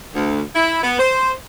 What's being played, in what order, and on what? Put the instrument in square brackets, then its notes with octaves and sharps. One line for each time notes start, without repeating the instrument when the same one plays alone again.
[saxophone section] D2
E4
B3
C5